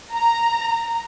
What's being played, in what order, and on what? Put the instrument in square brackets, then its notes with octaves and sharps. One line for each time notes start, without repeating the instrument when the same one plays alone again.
[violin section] A#5